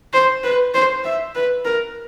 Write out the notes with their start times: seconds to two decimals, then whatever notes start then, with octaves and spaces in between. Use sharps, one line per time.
0.13 C5
0.44 B4
0.74 C5
1.04 E5
1.35 B4
1.65 A#4